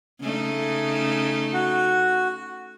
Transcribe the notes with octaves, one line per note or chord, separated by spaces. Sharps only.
C#3 A3 D#4
F#4